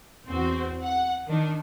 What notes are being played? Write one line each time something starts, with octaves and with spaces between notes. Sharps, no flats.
E2 C4 F#4
F#5
D#3 D4